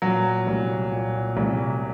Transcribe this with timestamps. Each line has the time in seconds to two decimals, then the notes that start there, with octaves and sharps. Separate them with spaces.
0.02 A#2 F#3
0.47 C2
0.92 A#2
1.37 C2